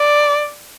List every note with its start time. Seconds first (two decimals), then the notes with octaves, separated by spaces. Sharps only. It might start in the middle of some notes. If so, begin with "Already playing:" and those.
Already playing: D5